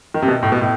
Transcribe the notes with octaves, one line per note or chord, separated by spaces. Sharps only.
D#3
C3
B2
A2
B2
A2